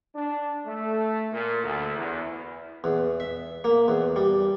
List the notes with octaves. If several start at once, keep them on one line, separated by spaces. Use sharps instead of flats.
D4
A3
A#2
D2
E2
E2
E5
A#3
E2
G3